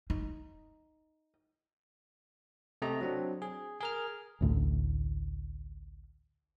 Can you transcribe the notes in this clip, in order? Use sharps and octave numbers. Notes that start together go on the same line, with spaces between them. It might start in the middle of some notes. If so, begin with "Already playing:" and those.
D#4
C3 A3 G4 D#5 A#5
F#3 C4 D4
G#4
G#4 A#4 F6
A1 D2 A2